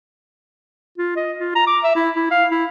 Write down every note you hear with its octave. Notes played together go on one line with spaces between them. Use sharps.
F4
D#5
F4
A#5
D6
E5
E4
E4
F5
E4